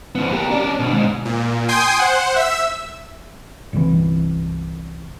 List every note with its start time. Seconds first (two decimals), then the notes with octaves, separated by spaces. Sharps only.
0.15 F3 B3
0.33 G4 A#4
0.51 C#4 D5
0.79 B2 D3
0.93 G#2
1.25 A#2
1.68 G5 G#5 C6 D#6 G6
1.99 C5 F#5
2.36 E5 E6
3.73 G1 C2 E3